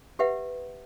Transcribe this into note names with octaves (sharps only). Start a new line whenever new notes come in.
G4 B4 E5 F#5